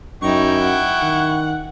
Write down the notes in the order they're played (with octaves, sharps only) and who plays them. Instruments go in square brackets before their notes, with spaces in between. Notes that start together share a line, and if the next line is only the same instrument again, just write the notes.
[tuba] F#2 [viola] D#4 [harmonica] E4 G5 C#6
[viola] F#5
[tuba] D#3